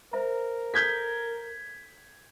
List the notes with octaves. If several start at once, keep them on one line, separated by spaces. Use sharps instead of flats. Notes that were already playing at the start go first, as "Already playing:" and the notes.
A#4 C5 E5 A#5
A4 G6 G#6 B6